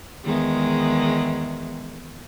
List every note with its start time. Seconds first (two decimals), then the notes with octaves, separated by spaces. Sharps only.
0.24 E2 D#3 G#3